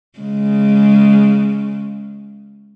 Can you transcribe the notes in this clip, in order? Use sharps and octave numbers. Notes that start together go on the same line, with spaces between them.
C#3 G#3